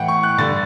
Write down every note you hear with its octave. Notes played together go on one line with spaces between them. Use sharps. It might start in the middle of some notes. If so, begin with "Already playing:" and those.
Already playing: A2 E3 F#5 G5
C#6
F#6
G2 D3 A6